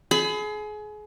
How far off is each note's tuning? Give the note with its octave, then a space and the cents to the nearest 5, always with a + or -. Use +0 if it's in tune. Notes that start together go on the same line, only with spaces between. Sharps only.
G#4 +30 B5 +40